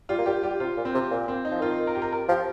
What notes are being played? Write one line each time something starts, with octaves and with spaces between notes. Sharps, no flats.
G3 F4
A#3
G3 G4
G3 G4
C3 F4
A#2
C4
C3
A#2
C4
D#4
F3
D#3 F4
A#4
G4
A#4
A#4
F3 G4